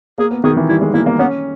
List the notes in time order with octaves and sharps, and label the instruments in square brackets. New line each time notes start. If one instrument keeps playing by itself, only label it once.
[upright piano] A#3 [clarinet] G#4
[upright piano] B3
[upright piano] D#3 [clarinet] G#4
[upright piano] E3
[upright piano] G3 [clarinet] E4
[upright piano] G#3
[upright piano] A#3 [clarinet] E4
[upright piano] A#3
[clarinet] B3 [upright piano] C#4